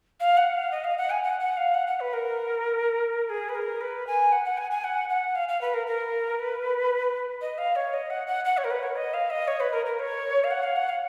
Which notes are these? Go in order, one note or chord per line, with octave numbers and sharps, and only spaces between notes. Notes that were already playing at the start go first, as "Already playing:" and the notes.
F5
F#5
F5
D#5
F5
F#5
G#5
F#5
F#5
F5
F#5
F#5
B4
A#4
G#4
B4
A#4
B4
G#5
F#5
F#5
G#5
G#5
F#5
F#5
F5
F5
B4
A#4
A#4
B4
D#5
F5
C#5
D#5
F#5
F#5
F#5
C#5
A#4
B4
C#5
D#5
F5
D#5
C#5
B4
A#4
A#4
C#5
F5
F#5
F5
F#5
F5